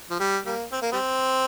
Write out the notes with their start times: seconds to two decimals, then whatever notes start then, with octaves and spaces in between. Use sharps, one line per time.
0.10 F3
0.19 G3
0.46 G3 A#3
0.72 C4
0.82 A#3
0.92 G3 C4